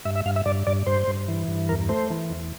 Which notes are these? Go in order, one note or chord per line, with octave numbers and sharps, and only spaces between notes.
G2 E5
E5
G2 F5
E5
G2 D5
G2 D5
G2 C5
G2
E3
G2
E2 A#4
A3 C5
E3
E2